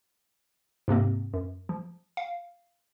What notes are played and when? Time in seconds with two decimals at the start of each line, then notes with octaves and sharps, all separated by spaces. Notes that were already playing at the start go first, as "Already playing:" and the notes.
0.88 G#2 C3 A#3 C4
1.33 F#2
1.69 F3
2.17 F5